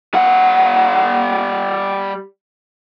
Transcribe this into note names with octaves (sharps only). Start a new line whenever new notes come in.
G3 F#5